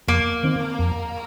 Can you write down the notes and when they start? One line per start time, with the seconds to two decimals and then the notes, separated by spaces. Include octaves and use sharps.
0.08 F2 A#3
0.43 D#3 C4
0.79 F2